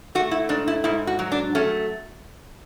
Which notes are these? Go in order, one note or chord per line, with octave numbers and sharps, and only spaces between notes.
A3 F#4
E4
G#2 D4
E4
G#2 E4
F#4
F#3
D4
A3 C#4